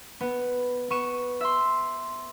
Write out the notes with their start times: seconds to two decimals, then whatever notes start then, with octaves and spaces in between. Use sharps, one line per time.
0.21 B3
0.90 B3 C#6 D#7 E7
1.41 E5 C6